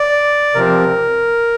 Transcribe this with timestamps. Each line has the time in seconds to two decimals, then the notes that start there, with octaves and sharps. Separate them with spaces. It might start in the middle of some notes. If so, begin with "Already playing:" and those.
Already playing: D5
0.55 C3 F3 C4 A#4